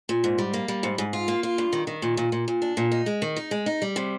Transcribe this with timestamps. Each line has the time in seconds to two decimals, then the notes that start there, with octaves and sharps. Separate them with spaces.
0.09 A#2
0.24 G#2
0.38 G3
0.54 A#3
0.68 G3
0.83 G#2
0.98 G#2
1.13 F4
1.28 A#3
1.43 F4
1.58 G2
1.73 D#3
1.87 D#3
2.02 A#2
2.17 A#2
2.32 A#2
2.48 A#2
2.62 D4
2.77 A#2
2.92 D#4
3.06 G#3
3.22 D#3
3.36 D#4
3.51 G#3
3.66 D#4
3.82 G3
3.96 C3